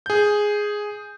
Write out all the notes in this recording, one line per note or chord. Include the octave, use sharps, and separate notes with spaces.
G#4 G6